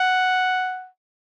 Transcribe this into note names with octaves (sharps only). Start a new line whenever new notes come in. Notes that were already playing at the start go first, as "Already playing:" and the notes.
Already playing: F#5